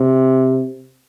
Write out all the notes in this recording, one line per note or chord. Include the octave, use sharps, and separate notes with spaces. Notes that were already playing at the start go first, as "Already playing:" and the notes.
Already playing: C3